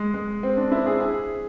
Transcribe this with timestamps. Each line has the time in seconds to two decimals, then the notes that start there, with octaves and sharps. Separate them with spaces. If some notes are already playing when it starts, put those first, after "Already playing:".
Already playing: G#3
0.14 G#3
0.43 C4
0.57 D4
0.72 E4
0.86 G#4
1.00 G#4